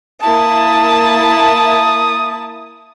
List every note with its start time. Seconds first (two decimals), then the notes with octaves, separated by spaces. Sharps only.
0.23 A#3 E4 A5 D#6